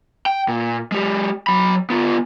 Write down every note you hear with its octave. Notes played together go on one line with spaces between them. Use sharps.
G5
A#2
G#3 G4
F#3 B5
B3 F4